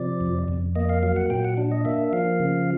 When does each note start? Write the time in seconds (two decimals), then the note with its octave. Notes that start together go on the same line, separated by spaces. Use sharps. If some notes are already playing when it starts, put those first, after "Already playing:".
Already playing: C3 F3 D5
0.21 F2
0.48 F2
0.76 A#3 D#5
0.89 F5
1.03 F#3 F5
1.16 F#5
1.30 A#2 G5
1.45 F#5
1.57 D4
1.72 D#5
1.85 A#3 E5
2.13 F3 F5
2.40 C#3